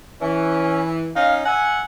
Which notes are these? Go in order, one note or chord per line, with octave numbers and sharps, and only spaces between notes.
E3 C#4
C#4 D#4 F5
E5 F#5 G#5